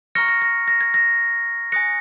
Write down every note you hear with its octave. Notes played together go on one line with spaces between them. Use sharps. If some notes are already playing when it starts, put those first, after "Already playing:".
A#5 C#6 F6 A#6 C#7
A#6
A#6
A#6
G#6
A#6
G#5 D#6 F#6 A#6 C#7